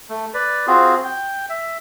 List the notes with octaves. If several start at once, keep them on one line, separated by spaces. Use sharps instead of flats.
A3
B4 D5
C4 F4 F#4 G#4
G5
E5